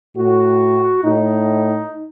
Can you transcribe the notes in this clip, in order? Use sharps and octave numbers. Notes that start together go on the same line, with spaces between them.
A2 F#4
A2 D#4